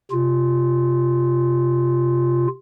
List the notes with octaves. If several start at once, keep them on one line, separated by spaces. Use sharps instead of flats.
C3 F4